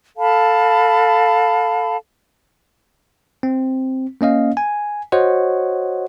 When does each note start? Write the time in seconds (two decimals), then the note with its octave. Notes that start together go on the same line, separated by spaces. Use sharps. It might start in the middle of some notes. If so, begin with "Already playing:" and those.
0.17 A4 F5 A5 B5
3.43 C4
4.21 A#3 C#4 D#5 F5
4.57 G#5
5.12 F#4 C5 C#5 D#5 F#5